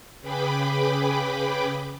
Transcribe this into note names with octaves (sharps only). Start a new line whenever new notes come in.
C#3 G#4 B4 G5 B5 D6